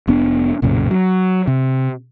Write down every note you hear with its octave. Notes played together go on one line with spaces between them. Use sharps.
F1 B3 D4
B1 F#2 A#2 C#3
F#3
C3